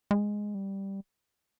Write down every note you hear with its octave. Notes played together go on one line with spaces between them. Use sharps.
G#3
G3